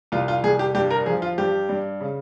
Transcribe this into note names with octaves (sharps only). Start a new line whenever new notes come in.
C2 F4
F4
C2 G#4
G4
G2 G4
A#4
F3 G#4
F4
G2 G4
G2
C#3